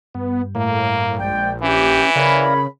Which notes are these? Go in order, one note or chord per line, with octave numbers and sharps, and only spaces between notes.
G2 B3
A2 A#3
A#1 G#3 D5 G5
E3 C#4 G4
C#3 A#4 C#5 D5 F5 A#5 B5